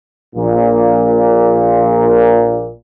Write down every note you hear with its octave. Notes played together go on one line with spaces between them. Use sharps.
A#1 A#2